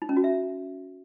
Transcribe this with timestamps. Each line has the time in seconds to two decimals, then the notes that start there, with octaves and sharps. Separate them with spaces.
0.02 D#4
0.09 C#4
0.16 F#4
0.24 E5